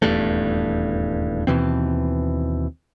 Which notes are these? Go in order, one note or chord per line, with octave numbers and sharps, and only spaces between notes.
D#1 E2 G2 A3
D#2 B2 E3 C4